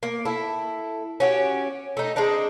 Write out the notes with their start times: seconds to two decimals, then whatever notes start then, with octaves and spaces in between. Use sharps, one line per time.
0.03 A#3
0.25 E4 A4
1.20 C#4 F#4 G4
1.97 A3 D#4
2.16 G#3 C4 D4 D#4